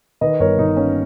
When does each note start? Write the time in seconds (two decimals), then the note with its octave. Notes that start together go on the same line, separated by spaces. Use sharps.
0.21 D#3 B4 D#5
0.40 G1 A#4 C#5
0.58 D#3 D#4
0.77 A#3 C#4